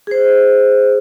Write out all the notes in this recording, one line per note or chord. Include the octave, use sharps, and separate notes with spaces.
G#4 C5